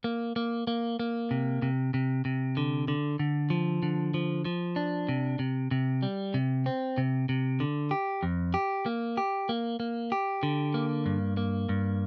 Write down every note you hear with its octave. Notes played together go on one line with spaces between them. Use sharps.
A#3
A#3
A#3
A#3
C3
C3
C3
C3
D3
D3
D3
F3
D3
F3
F3
D4
C3
C3
C3
G3
C3
C4
C3
C3
D3
G4
F2
G4
A#3
G4
A#3
A#3
G4
D3
A#3
G2
A#3
G2